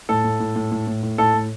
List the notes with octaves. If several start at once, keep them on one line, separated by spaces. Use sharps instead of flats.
A2 A4
A2
A2
A2
A2
A2
A2
A2 A4
A2